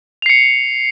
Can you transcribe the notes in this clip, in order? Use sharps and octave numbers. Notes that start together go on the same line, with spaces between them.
C7 C#7 F7